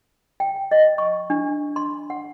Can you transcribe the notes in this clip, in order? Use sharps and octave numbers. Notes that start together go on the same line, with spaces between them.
G5
D#5
C#6
D4
C6
F#5